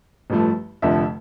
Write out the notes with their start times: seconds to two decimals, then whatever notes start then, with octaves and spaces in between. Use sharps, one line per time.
0.30 A1 G2 F3 A3
0.82 F1 F2 D3 F3 E5